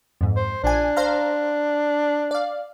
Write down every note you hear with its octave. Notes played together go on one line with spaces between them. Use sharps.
F2 G#2
C5
A#1 D4 G#5
C5 F5 A#5
D5 F5